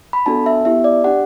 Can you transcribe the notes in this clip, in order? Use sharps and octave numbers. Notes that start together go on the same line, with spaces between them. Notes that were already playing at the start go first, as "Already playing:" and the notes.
B5
B3 D4 F#4 A4 A5
E5
B3 E4 G4 E5
D5
D4 G4 F#5